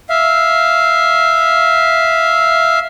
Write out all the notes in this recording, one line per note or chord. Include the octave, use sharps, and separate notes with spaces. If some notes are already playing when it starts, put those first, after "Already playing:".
E5 F5